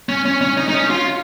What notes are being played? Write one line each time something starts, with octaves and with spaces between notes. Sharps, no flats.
C#4
C#4
C#4
D#4
D#4
C#4
F4